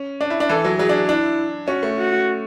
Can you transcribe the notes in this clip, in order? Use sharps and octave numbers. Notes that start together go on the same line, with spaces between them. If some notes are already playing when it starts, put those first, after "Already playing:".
Already playing: C#4
D4
E4
D4
E3 A4
F#3
F#3 G#4
D4
D4 E4
C#4 F#4
A3
F#4